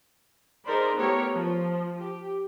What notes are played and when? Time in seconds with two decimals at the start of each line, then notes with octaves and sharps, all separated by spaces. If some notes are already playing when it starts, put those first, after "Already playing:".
0.65 D#4 G#4 A#4 C5 D5 B5
0.96 A3 B3 E4 G4 A#4 C#5
1.34 F3
1.99 G4